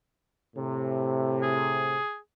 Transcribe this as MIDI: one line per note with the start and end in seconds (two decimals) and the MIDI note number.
0.56 1.98 45
0.56 1.98 48
1.43 2.18 68